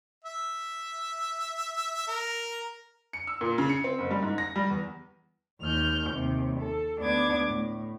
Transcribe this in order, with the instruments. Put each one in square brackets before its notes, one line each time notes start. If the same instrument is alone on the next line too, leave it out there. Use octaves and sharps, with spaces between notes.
[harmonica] E5
A#4
[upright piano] C#7
E6
A#2
C#3
C#7
C4
F#1
G3
G#2
A#6
G3
E2
[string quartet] D#2 F6 G6
D#2 C3
A4
D2 B3 D4 D6 G#6
A2